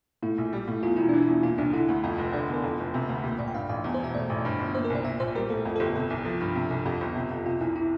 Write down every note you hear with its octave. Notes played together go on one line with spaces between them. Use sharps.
A2 E4
A#1
G3
A2
E2 F4
E1 E4
E3 D4
E4
E2
A#2 F4
C2 D4
D3 E4
D2
F2
F1
D3 D5
E2
A#4
F2 A4
F1
C3
D2
A#2 G4
A#1 D5
G5
G2 F5
A1 F5
E2 E5
C5
E1 E5
A2 D5
A1
G2
G1
A#2 C5
A#4
C2 D5
A#2 E5
A#1 C5
G3 A#4
A2 A4
F2
A4
G1 G4
C3 A4
C2
F3 A4
G2
C3
C2
F2 G4
G1
C3
F2
C3 F4
C2 E4
E4